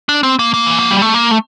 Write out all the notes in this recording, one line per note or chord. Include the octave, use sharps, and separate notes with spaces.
D4
C4
A#3
A#3
E3
F3
G3
A3
A#3
A3